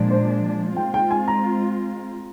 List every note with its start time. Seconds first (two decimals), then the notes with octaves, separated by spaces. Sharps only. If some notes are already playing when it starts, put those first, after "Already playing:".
Already playing: A#2 F3 G#3 D4
0.10 C5
0.76 G#3 C4 F4 G5
0.94 G5
1.11 G#5
1.28 A#5